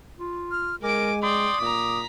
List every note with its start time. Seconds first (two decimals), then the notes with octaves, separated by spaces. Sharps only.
0.18 F4
0.51 F6
0.83 G#3 A#4 G#5 D6 D7
1.23 D5 G5 C6 D#6
1.61 A#2 A#5 D6 B6